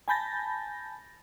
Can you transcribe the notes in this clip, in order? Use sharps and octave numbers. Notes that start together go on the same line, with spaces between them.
G#5 A5 B5 G6 A6 A#6